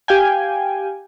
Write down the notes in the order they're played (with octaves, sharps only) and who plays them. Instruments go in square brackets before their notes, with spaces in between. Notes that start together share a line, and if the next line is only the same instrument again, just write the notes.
[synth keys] G4 F5 G5 G#5